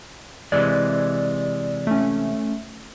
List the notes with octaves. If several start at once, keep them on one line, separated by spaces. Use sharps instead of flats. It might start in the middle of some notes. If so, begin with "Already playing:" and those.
C3 E3 G#3 D5
A3 C#4